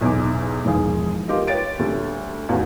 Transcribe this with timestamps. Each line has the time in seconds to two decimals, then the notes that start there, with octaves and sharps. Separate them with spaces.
0.01 B1 E2 G#2 G#3 D6
0.65 E1 G#2 E3 F3 G#4
1.28 F4 G4 A#4 D#5
1.47 B4 C#5 G5 A6 D7
1.79 D2 G3 A3
2.49 A1 E2 D#3 F#4 F5